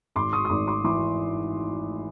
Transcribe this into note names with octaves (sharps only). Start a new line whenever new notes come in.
G#1 C6 D6
C#6 D#6
D#6
G#1 C6 D6
C6 D6
E3 C6 D6